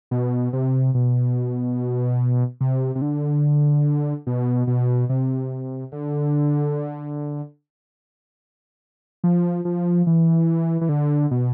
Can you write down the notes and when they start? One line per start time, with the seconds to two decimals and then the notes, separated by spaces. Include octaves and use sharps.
0.11 B2
0.53 C3
0.94 B2
2.61 C3
2.95 C3
3.02 D3
4.27 B2
4.67 B2
5.09 C3
5.92 D3
9.24 F3
9.65 F3
10.07 E3
10.81 E3
10.89 D3
11.31 B2